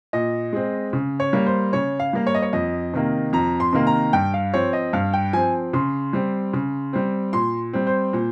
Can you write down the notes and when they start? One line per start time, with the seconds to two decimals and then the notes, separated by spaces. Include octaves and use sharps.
0.13 A#2 D#5
0.53 G#3 C4
0.93 C#3
1.20 C#5
1.33 G3 A#3
1.47 C5
1.73 C#3 C#5
2.00 F5
2.13 G3 A#3
2.27 C#5
2.35 D#5
2.42 C#5
2.53 F2 D#5
2.94 C3 D#3 A#3
3.33 F2 A#5
3.60 C6
3.73 C3 D#3 A#3
3.87 A#5
4.13 G2 G5
4.34 F5
4.54 F3 C4 C#5
4.73 D#5
4.93 G2 F5
5.14 G5
5.33 F3 C4 G#5
5.73 C#3 C6
6.13 G3 C4
6.53 C#3
6.93 G3 C4
7.33 A#2 C6
7.73 G3 C4
7.87 C5
8.13 A#2